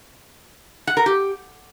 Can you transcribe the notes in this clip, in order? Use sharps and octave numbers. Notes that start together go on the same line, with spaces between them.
F#5
A#4
G4